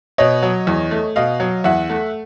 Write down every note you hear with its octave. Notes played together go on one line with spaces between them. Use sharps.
B2 C#5 D#5
F#3
E2
A3
B2 D#5 F5
F#3
E2 E5 F#5
A3